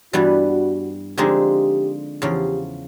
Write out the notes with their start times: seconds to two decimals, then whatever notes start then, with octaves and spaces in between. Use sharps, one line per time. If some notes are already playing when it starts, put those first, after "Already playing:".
0.13 G2 E3 G3 B3 F#4
1.18 D3 F3 G#3 C4 D#4 G4
2.22 E2 C#3 F3 G4